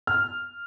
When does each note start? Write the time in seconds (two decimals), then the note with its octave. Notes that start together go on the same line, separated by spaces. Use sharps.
0.07 F6